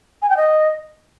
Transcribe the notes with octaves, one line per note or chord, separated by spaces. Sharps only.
G#5
G5
D#5